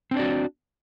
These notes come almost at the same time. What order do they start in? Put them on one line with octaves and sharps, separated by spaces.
C4 D4 D5 F#4